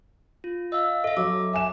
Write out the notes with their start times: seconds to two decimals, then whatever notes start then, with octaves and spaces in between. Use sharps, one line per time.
0.44 F4
0.72 D#5 F5 E6
1.04 A4 D#5 E5
1.17 F#3 D6
1.53 E5 G#5 E7